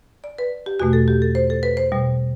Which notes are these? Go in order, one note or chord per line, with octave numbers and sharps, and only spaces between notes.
D5
B4
G4
E2 B2 A3 F#4
A4
G4
A4
C5
A4
B4
C5
B2 G3